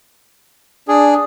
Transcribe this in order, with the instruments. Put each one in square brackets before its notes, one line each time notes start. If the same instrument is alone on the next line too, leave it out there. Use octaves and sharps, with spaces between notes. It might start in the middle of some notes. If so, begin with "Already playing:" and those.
[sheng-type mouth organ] D4 [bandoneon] G#4